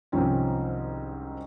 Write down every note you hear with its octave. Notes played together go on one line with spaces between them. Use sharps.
C2 G#2 D#3 F3 C4 C#4